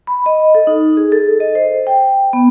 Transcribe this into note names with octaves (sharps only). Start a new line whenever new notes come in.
B5
D#5
A4
D#4
G#4
A4
D#5
C5
G5
B3